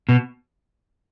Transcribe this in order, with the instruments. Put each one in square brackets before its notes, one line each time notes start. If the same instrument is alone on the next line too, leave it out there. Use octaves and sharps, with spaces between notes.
[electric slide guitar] B2